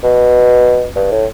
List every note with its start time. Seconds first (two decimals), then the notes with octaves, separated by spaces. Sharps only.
0.04 B2
0.96 G2
1.12 A2